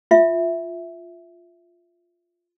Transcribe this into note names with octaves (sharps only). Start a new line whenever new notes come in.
F4 E5